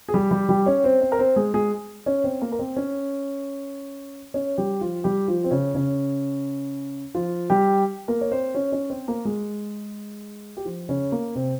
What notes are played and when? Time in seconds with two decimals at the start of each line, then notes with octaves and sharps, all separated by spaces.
0.08 G#4
0.14 G3 G4
0.31 G3 G4
0.49 G3 G4
0.66 C#4 C#5
0.84 C4 C5
1.01 C4 C5
1.12 A#4
1.19 C4 C5
1.36 G#3 G#4
1.54 G#3 G#4
2.06 C#4 C#5
2.24 C4 C5
2.42 A#3 A#4
2.52 A#4
2.59 C4 C5
2.76 C#4 C#5
4.34 C#4 C#5
4.58 G3 G4
4.81 F3 F4
5.04 G3 G4
5.28 F3 F4
5.44 C4
5.51 C#3 C#4
5.74 C#3 C#4
7.15 F3 F4
7.50 G3 G4
8.08 A#3 A#4
8.21 C#5
8.32 C4 C5
8.55 C#4 C#5
8.72 C#4 C#5
8.90 C4 C5
9.08 A#3 A#4
9.25 G#3 G#4
10.57 G4
10.65 F3 F4
10.89 C#3 C#4
11.12 A#3
11.35 C3 C4